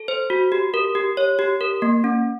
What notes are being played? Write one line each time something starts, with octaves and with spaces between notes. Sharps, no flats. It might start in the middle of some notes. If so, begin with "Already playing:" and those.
Already playing: A4
C5
F#4
G4
A#4
G4
C#5
G4
A#4
A#3
C#4